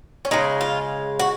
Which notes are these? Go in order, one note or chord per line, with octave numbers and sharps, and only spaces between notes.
C#4
C#3 G#3 D#4
F4
F#4